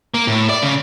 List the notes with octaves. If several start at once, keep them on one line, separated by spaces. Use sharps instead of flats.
A#3
A2
D5
C#3